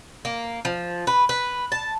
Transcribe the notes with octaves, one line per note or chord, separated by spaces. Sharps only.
A#3
F3
B4
B4
A5